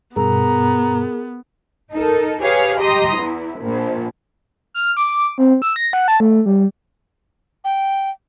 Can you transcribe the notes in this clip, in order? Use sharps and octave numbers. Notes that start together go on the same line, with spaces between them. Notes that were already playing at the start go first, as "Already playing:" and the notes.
G2 B2 B3 G#4 A#4 A#5
D#4 A4 A#4
G4 G#4 B4 C#5 F5
G4 D#5 A#5 C6 D#6
E2 E4
A#1 A#2
F6
D6
C4
E6
A#6
F#5
A5
A3
G3
G5